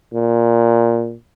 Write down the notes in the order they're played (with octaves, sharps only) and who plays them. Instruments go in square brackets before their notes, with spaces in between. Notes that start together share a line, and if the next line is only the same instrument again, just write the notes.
[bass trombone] A#2